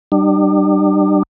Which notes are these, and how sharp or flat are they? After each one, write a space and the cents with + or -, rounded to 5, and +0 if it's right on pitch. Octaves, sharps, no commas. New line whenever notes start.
G3 -20 D4 +40